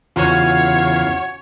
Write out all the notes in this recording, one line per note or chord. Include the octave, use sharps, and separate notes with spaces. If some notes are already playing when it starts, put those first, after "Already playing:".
E2 C#3 C#4 F4 F#4 C#5 F5